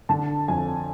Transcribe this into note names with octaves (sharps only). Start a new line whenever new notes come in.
D3 A5
F2 G#5